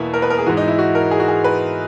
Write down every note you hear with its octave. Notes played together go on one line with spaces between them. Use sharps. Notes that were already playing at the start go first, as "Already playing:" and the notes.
Already playing: E2 B2 A#3 B3 E4
A#4
B4
A#4
G#4
G#2 E3 F#4
D#4
E4
F#4
A#4
G#4
F#4
G#4
B4